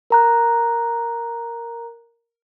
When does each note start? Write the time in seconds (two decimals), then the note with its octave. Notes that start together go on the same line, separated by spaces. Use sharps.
0.10 A#4 A#5 F#6